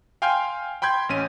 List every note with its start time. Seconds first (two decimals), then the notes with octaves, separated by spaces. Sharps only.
0.22 F5 G5 G#5 C6 F6 G6
0.82 G5 B5 C6 G6 G#6
1.09 A1 C#4 D#7